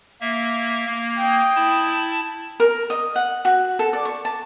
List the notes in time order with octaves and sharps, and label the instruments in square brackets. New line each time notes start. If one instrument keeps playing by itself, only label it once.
[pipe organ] A#3 E5
A#3
[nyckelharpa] D#5 G5
[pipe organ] E4 A5
[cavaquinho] A#4
D#5
F#5
F#4
A4
D5
C#6
A5